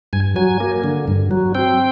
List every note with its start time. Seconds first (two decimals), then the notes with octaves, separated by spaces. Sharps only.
0.13 G2 G#5
0.36 F#3 G#5
0.60 A#3
0.84 D3
1.08 G2
1.31 F#3
1.55 C4 G5